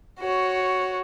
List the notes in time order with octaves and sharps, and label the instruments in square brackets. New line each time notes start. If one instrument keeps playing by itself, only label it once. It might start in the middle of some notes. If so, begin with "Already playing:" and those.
[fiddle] F#4 C#5